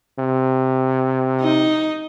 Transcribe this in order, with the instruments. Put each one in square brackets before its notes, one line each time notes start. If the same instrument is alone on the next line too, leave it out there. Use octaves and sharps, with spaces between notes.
[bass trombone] C3
[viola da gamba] D#4